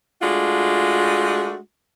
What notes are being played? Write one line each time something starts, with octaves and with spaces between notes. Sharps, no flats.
G#3 A3 D4 F4 F#4